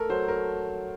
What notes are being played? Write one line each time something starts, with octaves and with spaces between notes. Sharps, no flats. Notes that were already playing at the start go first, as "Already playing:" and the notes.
Already playing: A3 A4 A#4
F#3 C5
A#4